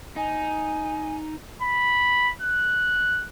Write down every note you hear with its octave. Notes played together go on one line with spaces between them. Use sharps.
D#4 G#5
B5
F#6